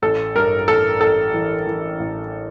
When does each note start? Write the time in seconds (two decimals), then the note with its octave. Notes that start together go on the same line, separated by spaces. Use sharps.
0.02 A1 A4
0.36 G2 A#4
0.68 A1 A4
1.01 A1 A4
1.34 E3
1.67 E3
2.00 A1